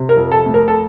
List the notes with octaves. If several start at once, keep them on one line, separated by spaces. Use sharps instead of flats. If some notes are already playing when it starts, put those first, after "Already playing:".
Already playing: C3
A#4
F2
A4
A3
A#4
A4